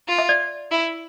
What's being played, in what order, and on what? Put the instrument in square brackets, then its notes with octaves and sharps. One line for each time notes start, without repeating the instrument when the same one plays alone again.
[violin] F4
[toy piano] E5
D5
[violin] E4